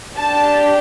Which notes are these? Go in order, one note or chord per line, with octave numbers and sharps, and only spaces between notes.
D4 G4 A5